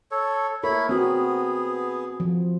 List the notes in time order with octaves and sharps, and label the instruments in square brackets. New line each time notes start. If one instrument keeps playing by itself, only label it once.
[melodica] A4 C#5
[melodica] E4 C#5 B5 [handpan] A4 A#4
[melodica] B3 G#4 [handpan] C4 F#4
[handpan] F3